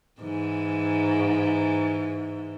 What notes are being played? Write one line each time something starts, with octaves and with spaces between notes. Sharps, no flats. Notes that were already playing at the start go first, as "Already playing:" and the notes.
G#2 E3